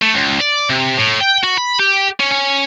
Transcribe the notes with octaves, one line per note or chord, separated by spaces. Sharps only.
A3
C#2
D5
C3
A2
G5
F#4
B5
G4
C#4
C#4